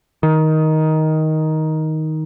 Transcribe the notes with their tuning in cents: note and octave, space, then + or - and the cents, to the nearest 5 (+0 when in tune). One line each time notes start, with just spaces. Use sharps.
D#3 +10